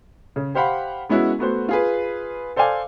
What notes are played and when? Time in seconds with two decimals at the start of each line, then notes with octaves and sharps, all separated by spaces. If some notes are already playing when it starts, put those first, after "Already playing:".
0.36 C#3
0.55 G4 C5 F5 F#5 B5
1.09 G#3 B3 C#4 E4 F#4
1.39 A3 B3 F#4 C5
1.69 F4 G#4 B4
2.56 A4 C5 D5 F5 G#5